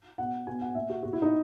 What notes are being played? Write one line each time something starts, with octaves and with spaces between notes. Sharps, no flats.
B2 F#5
B2 G#5
F#5
A#2 E5
F#4
A#2 F#4
E4
D#4